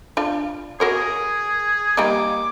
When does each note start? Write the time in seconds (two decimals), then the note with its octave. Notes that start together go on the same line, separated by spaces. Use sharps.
0.17 D4 F4
0.80 F#4 G#4 A#4 C#5
1.97 G3 A#3 D#4 D6